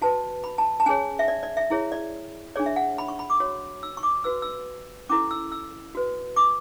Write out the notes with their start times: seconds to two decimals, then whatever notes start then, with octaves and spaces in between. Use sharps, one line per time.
0.02 F#4 B4 A5
0.44 B5
0.58 A5
0.80 A5
0.86 C#4 G#4 C#5 G#5
1.19 E5
1.28 D5
1.43 D5
1.57 E5
1.70 E4 G#4 C#5
1.92 D5
2.56 D4 G#4 C#5 D5
2.66 E5
2.76 F#5
2.98 B5
3.08 C#6
3.19 B5
3.30 D6
3.40 F#4 C#5
3.83 E6
3.97 C#6
4.03 D6
4.24 F#4 B4 E6
4.42 E6
5.09 C#4 E4 A4 D6
5.31 E6
5.52 E6
5.95 F#4 B4
6.36 D6